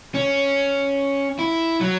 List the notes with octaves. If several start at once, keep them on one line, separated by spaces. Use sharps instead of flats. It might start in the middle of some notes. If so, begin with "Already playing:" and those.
C#4
E4
F#3